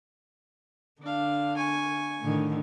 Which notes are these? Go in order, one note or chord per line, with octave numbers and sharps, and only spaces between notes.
D3 D4 F5
G#5 C#6
A2 D3 D#3